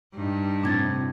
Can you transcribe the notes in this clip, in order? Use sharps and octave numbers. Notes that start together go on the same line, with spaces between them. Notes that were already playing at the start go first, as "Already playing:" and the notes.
G2 D#4
A2 C3 D4 G#6 A6